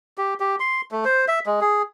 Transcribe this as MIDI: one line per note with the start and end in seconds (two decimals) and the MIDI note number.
0.18 0.34 67
0.40 0.56 67
0.60 0.81 84
0.91 1.05 57
1.05 1.25 72
1.28 1.39 76
1.46 1.60 56
1.61 1.82 68